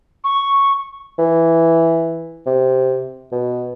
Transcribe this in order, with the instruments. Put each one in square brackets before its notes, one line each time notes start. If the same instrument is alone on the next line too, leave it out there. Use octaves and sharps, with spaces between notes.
[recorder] C#6
[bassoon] E3
C3
B2